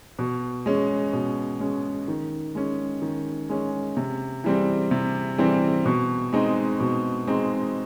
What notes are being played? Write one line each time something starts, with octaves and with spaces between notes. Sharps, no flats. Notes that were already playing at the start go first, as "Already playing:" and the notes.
B2
G#3 C#4
B2
G#3 C#4
D#3
G#3 C#4
D#3
G#3 C#4
C3
E3 G3 C4
C3
E3 G3 C4
B2
G#3 C4 D#4
B2
G#3 C4 D#4